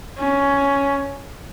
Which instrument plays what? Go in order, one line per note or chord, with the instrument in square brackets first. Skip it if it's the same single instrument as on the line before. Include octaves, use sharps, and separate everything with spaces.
[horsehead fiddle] C#4